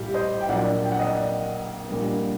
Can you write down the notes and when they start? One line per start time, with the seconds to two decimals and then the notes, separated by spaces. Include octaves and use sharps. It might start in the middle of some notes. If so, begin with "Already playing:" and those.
Already playing: A#1 A2 G3 G4
0.14 C5 D#5
0.41 G5
0.49 A#1 A#2 F#3 D5 F#5
0.84 G5
0.92 F#5
0.99 D#5
1.07 D5 F#5
1.89 A#1 A#2 G3 A#3